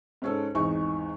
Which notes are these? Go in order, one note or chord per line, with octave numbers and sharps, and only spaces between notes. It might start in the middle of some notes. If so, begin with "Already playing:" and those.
G#2 C#4 A4
G#1 E2 D#4 G#5 C#6